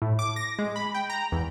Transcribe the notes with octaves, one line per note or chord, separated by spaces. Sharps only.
A2
D6
A#6
G#3
B5
G5
A#5
E2